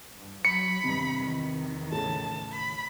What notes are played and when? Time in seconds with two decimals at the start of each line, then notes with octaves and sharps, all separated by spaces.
0.15 G2
0.45 F#3 B5 C#7
0.84 E2 G2 C3 D#3
1.18 E2 D#3 E3
1.92 A2 C#3 A5
2.52 B5